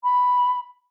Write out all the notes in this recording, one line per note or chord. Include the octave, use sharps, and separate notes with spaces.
B5